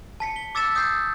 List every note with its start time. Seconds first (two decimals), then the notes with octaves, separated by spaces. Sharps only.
0.20 A5 B6 C#7
0.36 G7
0.55 D6 E6 A6 B6 C#7 E7
0.75 D#6 G6 A6 C7